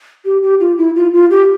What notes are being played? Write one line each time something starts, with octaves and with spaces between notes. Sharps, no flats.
G4
G4
F4
E4
F4
F4
G4